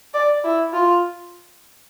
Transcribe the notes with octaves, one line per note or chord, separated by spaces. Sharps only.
D5
E4
F4